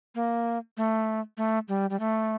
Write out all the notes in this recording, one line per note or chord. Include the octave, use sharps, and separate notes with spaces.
A#3
A3
A3
G3
G3
A3